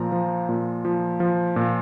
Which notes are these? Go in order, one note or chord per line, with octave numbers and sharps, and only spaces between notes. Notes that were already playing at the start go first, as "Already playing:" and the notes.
Already playing: A#2 F3 F5 A#5
F3
A#2
F3
F3
A#2